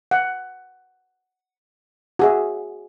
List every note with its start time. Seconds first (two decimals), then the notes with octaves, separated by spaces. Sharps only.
0.11 F#5
2.19 F#4 G#4 E5